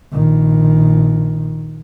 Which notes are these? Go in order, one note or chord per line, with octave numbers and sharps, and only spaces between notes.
A#1 D#3